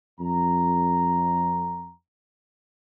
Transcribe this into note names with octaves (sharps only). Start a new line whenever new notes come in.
F2 A#5